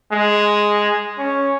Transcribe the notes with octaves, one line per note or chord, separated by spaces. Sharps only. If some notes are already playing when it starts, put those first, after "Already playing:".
G#3
C#4